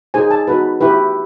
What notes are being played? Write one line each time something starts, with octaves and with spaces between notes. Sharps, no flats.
D#4 G#4 C5 G#5
A5
D#4 F#4 B4
E4 G4 B4